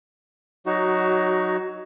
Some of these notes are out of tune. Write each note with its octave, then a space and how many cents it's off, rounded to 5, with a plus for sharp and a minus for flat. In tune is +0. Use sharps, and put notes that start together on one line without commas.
F#3 +0 D#4 +0 F#4 +20